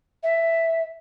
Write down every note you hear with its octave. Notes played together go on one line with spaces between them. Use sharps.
E5